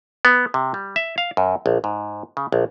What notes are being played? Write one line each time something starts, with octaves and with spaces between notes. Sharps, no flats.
B3
C3
G3
E5
F5
F#2
A#1
G#2
C#3
A#1